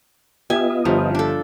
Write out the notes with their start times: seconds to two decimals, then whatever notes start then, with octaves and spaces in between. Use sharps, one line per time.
0.50 B3 F4 G4 D#5 E5 G#5
0.85 G1 F3 G3
1.15 D4 A4